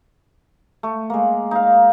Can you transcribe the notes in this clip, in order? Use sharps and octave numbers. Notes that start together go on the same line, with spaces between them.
A3
G#3 A#3
D#4 F5